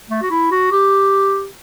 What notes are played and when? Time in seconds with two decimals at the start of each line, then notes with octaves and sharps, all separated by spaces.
0.10 A3
0.22 F#4
0.31 E4
0.51 F#4
0.72 G4